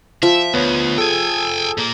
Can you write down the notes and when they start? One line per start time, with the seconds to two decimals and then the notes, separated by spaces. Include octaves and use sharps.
0.23 F3 E5
0.54 D2 B3 C#5
0.98 G#4 A4 G5 G#5
1.78 A#2 A#3